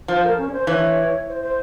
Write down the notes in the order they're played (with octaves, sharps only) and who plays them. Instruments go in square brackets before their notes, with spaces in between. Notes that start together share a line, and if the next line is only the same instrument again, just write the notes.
[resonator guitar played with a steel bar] F3 [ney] C5
[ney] A#4
C#4
C#5
C5
[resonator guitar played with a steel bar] E3 [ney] C#5
[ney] C5
C5